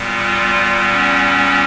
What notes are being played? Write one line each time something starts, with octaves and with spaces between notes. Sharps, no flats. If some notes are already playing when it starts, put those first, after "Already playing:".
Already playing: A#2 G3 B3
F4
C#4